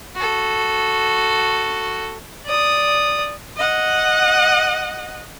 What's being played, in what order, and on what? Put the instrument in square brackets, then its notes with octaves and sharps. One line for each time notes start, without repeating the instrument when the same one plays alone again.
[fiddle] F#4 A4
D5 D#6
[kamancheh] D#5 F#5